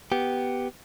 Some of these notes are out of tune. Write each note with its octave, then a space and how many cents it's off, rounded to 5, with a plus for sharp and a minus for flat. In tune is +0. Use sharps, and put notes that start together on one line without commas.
B3 +0 G4 -5